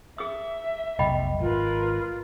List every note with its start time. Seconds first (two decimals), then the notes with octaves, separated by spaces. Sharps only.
0.18 G#4 E5 D#6
0.99 F1 B1 D#5 G5 B5
1.40 G#1 F4 A#4 B4